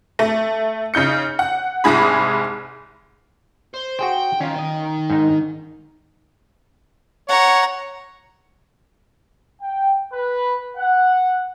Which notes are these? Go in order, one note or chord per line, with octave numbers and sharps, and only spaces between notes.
A3
C#3 D#4 G6 C#7
F#5
C2 G#2 G#4 B5
C5
F#4 G#4 C5 G5
D#3 C#4 F4
D#5
G#2 D#4
C#5 F#5 A#5
G5
B4
F#5